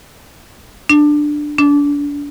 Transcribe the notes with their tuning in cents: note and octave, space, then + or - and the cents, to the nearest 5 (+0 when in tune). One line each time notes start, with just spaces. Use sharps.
D4 +10
D4 -30